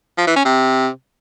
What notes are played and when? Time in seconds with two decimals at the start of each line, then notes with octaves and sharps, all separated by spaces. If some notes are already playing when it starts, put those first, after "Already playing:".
0.18 F3
0.27 E3
0.36 C#4
0.45 C3